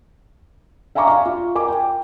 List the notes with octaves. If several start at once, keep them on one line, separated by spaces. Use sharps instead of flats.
E5 F5 G#5 A#5 C#6 D6
F5
F4
A#4 G#5 D6
G5